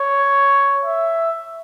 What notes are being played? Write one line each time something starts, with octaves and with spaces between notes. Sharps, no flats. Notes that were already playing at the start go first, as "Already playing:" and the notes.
Already playing: C#5
E5